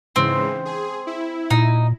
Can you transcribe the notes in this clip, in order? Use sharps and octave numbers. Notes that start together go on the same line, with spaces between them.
G#2 C#3 E3 C4
G#4
E4
A#2 D#4